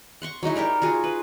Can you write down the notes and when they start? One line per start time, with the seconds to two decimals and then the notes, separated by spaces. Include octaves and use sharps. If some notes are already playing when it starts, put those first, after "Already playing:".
0.22 F#5 C6 C#6
0.43 F#3 G#3 D#4 E4
0.55 D#4 G4 A#4 D5
0.82 F4 F#4 G#4
1.04 B4